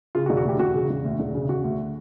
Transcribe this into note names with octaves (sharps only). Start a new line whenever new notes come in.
C#3 F4
F#4
E1
F#4
D2 G4
E1 F#4
C#3
E1
D2
E1
C#3
E1 F#4
D2